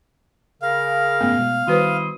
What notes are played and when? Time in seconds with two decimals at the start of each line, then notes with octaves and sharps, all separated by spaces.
0.62 C#3 A#4 F5
1.20 F#1 G#2 A3 B3 C#4
1.38 B2 G#3
1.68 D#3 G3 E4 F#4 B4 C5 C6 D#6